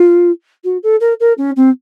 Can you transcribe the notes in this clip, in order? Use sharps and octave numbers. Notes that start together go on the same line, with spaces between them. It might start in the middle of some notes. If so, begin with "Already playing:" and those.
Already playing: F4
F#4
A4
A#4
A#4
C#4
C4